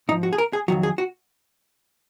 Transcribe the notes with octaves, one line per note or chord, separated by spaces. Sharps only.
G#2 F3 D#4
F#4
G#4
A#4
G#4
F2 D#3 F#3 F#4
G#4
F#4